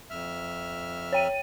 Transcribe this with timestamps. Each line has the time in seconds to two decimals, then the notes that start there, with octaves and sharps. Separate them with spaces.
0.10 F2 E5 F6
1.13 C#5 G5 D#7